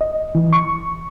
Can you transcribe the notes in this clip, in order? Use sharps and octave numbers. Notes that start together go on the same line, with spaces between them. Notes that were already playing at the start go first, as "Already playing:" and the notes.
D#5
E3
C#6